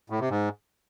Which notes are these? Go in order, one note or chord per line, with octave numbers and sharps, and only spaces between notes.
A2
C3
G#2